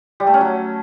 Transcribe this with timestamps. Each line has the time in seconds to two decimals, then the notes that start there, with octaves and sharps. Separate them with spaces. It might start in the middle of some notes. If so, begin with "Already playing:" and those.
0.20 G3
0.27 A3
0.34 C#4
0.41 F#3